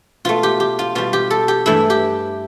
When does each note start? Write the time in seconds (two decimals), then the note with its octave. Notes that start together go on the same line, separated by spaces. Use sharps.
0.25 B2 A3 F4
0.43 G4
0.60 G4
0.79 F4
0.95 B2 G3 F4
1.13 G4
1.30 A4
1.48 G4
1.66 G2 E3 A3 E4
1.90 G4